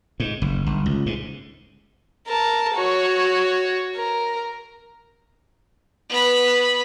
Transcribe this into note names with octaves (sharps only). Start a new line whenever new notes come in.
G#2
F#1
G1
C#2
G#2
A#4 A5
F#4 C#5
A#4
B3 B5